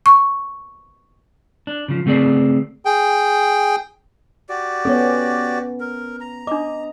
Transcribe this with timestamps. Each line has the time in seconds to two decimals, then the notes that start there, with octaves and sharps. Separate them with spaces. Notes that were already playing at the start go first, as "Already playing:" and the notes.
0.06 C#6
1.67 D4
1.88 C#3 F3
2.06 C#3 A3 C4 G#4 D5
2.85 G#4 G5
4.49 F#4 G4 D5
4.85 B3 C#4 A4 C#5
5.80 A#4
6.21 A#5
6.47 D4 D#5 D6